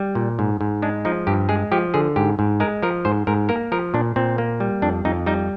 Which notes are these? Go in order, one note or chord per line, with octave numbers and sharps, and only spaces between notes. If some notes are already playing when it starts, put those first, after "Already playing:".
Already playing: G3
A#2
G#2
G#2
G#3 D4
F3 D#4
G2 G4
G#3 G#4
F3 G4
D3 G#4
G#2 G4
G#2
G#3 A#4
F3 A#4
G#2 C5
G#2 A#4
A#3 A#4
F3 A#4
A#2 D4
A#2 C4
A#3
G3
F2 D4
F2 D#4
G3 D#4